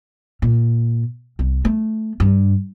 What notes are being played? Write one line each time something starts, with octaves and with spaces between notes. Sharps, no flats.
A#2
C2
A3
G2